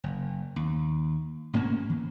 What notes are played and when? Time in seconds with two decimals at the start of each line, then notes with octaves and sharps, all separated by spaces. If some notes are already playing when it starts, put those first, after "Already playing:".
0.04 F#1
0.56 D#2
1.53 A1 G#2 A#3 C#4
1.90 E3